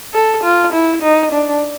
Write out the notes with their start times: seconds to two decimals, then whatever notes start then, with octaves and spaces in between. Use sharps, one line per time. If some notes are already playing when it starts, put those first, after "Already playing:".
0.14 A4
0.44 F4
0.73 E4
1.03 D#4
1.32 D4